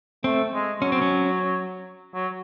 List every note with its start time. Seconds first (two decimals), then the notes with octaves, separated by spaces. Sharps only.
0.24 A3 C4
0.54 G#3
0.81 F#3 C#4
0.92 C4
1.02 C#4
2.14 F#3